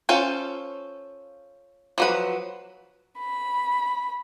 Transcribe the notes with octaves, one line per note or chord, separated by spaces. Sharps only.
C#4 F4 A4 C5
F3 F#3 B4
B5